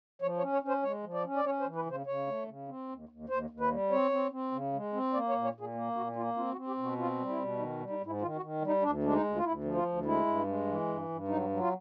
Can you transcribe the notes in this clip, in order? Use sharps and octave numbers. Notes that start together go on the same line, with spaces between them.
F3 C#5
C#5
C#4
C#5
C#4
C5
G#3 C#5
F3
D5
C#4
D5
C#4 C#5
C5
E3
B4
C#3 C5
C#3 C#5
A3
C#3
C4
D#2
D#2
D#2 C5
D#2
B4
G3
C4 C#5
C4
C4
C#3
G#3
C4
A#3 D5
C#5
A#2
C#5
A#2
G#4
A#3
A#2 F#4
A#3 F4
C4 F4
F#4
C4
G4
B2
F#4
C4 F4
G3
E4
B2
D#3 D#4
G3
D#4
G#2
E4
D#3 F4
F#4
D#3
G3
D#4
D2 D4
G#3 D4
D#4
D2
F4
D2 E4
F3
F4
D2
G#3 E4
G2
G#3
E3
G2
G2
F#3 D#4
F#3
F4